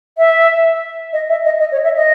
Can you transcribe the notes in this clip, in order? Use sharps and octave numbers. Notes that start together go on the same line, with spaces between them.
E5
D#5
E5
D#5
D#5
C#5
E5
D#5